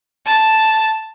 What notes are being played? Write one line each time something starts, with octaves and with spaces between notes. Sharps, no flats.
A5